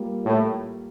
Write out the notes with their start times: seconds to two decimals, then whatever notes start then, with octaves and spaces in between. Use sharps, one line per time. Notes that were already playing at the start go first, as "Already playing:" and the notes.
Already playing: G3 A#3 F4
0.26 A2